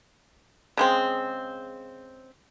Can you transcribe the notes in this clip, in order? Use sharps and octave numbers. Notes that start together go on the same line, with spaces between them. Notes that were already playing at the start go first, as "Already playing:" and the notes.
C#3 G#3 C4